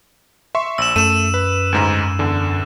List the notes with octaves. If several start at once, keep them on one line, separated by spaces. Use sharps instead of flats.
E5 C6 C#6
A#1 E6 E7
F#2 A3 D#7 E7
B4
D2 G#2 A#5
E2 D3